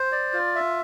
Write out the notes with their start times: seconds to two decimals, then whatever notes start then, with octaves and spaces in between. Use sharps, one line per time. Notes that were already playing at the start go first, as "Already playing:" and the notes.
Already playing: C5
0.12 D5
0.33 F4
0.55 E5